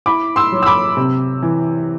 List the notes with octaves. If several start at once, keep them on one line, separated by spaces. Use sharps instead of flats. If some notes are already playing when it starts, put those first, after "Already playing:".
E4 B5 D6
C6 E6
F#3
E6
B5 D6
C3
E3